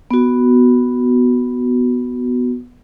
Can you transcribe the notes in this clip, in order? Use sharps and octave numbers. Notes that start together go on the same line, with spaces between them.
B3 F#4